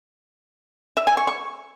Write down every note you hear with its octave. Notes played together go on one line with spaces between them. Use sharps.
E5
G#5
C#6
C#6